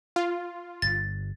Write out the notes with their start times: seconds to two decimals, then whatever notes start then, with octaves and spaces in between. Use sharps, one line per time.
0.16 F4
0.82 G1 G2 A6